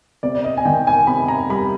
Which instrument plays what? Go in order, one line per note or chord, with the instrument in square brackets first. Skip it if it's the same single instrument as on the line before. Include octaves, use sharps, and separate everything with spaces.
[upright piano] C3 D5
D5
D#5
G#5
D#3 G5
G#5
C3 B5
A#5
G3 B5